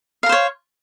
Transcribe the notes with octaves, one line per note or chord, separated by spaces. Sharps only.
A#4 C5 C#5 F5